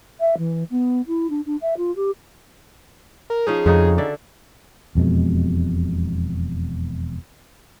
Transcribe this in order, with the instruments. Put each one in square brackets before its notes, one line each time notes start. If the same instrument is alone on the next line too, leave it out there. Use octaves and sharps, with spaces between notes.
[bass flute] E5
E3
B3
E4
D4
D4
E5
F4
G4
[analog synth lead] A#4
[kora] F3 C#4 D#4 [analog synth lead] G#4
[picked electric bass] F2 [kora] C#3 D#4 F#4
[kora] D3 D5 E5
[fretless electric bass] E1 F2 B2 G#3